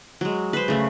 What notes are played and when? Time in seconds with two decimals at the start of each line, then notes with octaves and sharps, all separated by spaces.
0.21 F#3 G#3
0.53 B4 C5
0.68 C#3 A3